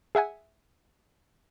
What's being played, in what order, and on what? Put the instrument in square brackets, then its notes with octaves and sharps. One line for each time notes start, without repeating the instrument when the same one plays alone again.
[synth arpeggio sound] G#4 E5 F#5 G#5